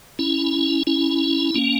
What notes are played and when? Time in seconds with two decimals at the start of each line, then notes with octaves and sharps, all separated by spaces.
0.19 C#4 E4
0.87 C#4 E4
1.54 A#3 C#4